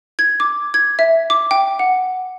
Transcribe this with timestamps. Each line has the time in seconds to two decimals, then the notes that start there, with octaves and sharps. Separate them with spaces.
0.19 G#6
0.40 D6
0.74 G#6
0.99 E5
1.30 D6
1.51 G5
1.79 F#5